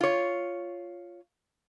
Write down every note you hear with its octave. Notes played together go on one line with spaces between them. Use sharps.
F4 C#5